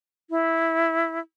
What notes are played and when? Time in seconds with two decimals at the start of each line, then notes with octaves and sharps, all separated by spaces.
0.30 E4